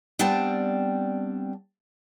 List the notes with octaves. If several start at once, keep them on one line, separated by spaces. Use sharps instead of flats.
G3 B3 C4 D4 G5 A5